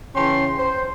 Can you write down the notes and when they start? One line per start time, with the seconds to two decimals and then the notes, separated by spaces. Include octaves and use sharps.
0.16 C#3 E3 C#4 G5 A5 C6
0.58 C5